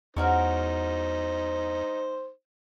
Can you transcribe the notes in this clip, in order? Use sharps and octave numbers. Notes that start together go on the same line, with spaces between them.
E2 C#4 D#4 F#4 A#4 C5